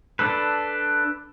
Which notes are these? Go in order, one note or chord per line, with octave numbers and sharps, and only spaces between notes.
D4 A4 B4